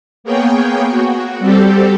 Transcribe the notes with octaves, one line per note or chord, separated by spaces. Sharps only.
A#3 B3 G#4 C#5 G5
F#4
G3 C4 G4 A4